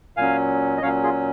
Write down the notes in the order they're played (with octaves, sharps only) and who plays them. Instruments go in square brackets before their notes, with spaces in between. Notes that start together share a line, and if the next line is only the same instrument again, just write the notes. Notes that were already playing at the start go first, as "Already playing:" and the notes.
[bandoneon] A#2 F#3 C#4 F5 G#5
D#5
A#2 F#3 C#4 C#5 F5
F4 G#4